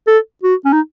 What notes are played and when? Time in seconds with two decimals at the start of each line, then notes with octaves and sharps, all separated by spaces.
0.07 A4
0.43 F#4
0.65 C#4
0.73 D#4